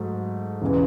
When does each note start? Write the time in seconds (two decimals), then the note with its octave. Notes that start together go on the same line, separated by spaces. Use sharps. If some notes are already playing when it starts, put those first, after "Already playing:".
Already playing: G#2 F#3 A3
0.61 E1 C#3 E3